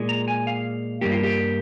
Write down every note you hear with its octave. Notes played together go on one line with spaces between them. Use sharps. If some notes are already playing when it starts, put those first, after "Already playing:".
Already playing: A#2 G#3
A#5
G#5
F5
G2 G3 A#3 G4
F4
G4